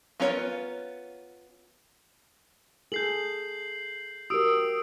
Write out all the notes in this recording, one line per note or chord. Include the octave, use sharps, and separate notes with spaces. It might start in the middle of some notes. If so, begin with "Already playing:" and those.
B3 C#4 F4 A#4 C#5
G#4 A4 G6 C7 F#7
F#4 G4 A#4 D#6 E6 D7